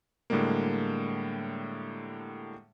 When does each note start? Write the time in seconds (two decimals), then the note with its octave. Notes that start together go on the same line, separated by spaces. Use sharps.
0.30 A2 D3 G3 G#3 A#3